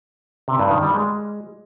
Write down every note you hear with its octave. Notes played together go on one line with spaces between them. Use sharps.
C3
G2
D#3
G3
G#3